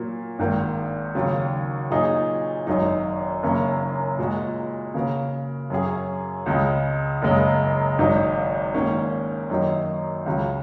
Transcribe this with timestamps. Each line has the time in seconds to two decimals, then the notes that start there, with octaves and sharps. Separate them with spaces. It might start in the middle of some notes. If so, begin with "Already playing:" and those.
Already playing: A#2 F#3 A#3
0.39 G#1 G#2 D#3 A#3
1.15 D#2 C#3 F#3
1.91 A#2 F#3 D#4 G#4
2.67 G#1 F#2 F#3 D#4
3.43 F#1 F#2 C#3 A#3 C#4
4.19 A#2 G#3 F#4
4.94 C#3 A#3 F#4 A#4
5.70 F#2 F#3 C#4 G#4
6.46 C#2 C#3 G#3
7.22 F#1 F#2 C#3 G#3
7.98 G#1 G#2 F#3 D#4
8.74 G#2 D#3 A#3 C#4 A#4
9.50 F#2 D#3 F#3 A#3 D#4
10.26 C#2 C#3 F#3